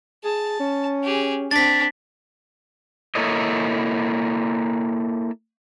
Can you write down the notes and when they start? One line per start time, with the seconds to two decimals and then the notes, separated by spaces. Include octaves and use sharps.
0.24 G#4 A5
0.60 C#4
1.03 G4 G#4
1.51 C4 D4 A6 B6
3.15 A#3 E4 A4 C#5 D#5